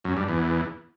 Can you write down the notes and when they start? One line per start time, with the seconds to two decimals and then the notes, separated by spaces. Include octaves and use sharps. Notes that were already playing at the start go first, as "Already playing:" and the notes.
0.05 F#2
0.17 G2
0.28 E2